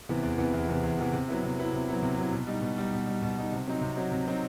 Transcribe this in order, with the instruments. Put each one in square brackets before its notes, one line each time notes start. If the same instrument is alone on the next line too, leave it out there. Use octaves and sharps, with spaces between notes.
[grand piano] C3 E3 B3
E2
C3 E3 B3
E2
C3 E3 B3
E2
C3 E3 B3
C3
F#3 B3 E4
C3
F#3 B3 E4
C3
F#3 B3 E4
C3
F#3 B3 E4
B2
G3 D#4
B2
G3 D#4
B2
G3 D#4
B2
G3 D#4
C3
F#3 C4 D#4
C3
F#3 C4 D#4
C3
F#3 C4 D#4